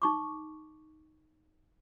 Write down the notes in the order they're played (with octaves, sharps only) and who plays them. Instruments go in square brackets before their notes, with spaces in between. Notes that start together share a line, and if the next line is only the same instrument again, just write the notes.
[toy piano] D#4 C#6 D6